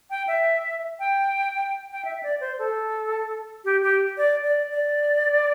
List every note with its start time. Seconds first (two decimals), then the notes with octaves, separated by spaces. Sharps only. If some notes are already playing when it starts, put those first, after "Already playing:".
0.10 G5
0.28 E5
1.00 G5
1.92 G5
2.05 E5
2.23 D5
2.41 C5
2.59 A4
3.65 G4
3.83 G4
4.17 D5
4.44 D5
4.71 D5